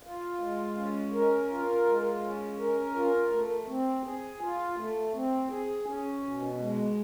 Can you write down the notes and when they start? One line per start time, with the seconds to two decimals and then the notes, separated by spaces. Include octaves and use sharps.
0.03 F4
0.40 G#3
0.77 C#4
1.12 A#4
1.49 F4
1.86 G#3
2.22 C#4
2.59 A#4
2.95 F4
3.32 A3
3.67 C4
4.05 G#4
4.41 F4
4.77 A3
5.13 C4
5.50 G#4
5.86 C#4
6.23 B2
6.59 G#3